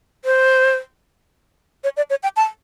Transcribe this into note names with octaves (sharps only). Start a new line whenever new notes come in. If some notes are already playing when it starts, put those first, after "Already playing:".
C5
C#5
D5
C#5
G5
A5